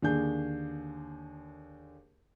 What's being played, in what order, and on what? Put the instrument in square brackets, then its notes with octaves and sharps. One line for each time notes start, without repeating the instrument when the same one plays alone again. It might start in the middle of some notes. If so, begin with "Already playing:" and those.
[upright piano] D#2 D3 D4 G#4 G6